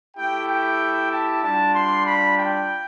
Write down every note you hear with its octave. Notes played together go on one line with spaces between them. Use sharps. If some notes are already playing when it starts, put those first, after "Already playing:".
A3 E4 G4 G5
G5
A5
G3 D4 F4 A5
C6
B5
G5